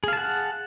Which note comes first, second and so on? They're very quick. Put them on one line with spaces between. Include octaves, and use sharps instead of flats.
G#4 F5 A5 F#5